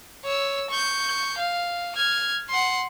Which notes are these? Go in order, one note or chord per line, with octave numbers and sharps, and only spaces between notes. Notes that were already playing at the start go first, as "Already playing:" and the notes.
C#5 E6
C#6 G6
F5
F6 G#6
F#5 C6